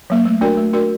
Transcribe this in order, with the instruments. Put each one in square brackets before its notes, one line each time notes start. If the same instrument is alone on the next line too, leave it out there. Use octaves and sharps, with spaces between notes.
[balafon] F#3 A#3
A3
D4 F#4 A#4 D5
A3
D4 F#4 A#4 D5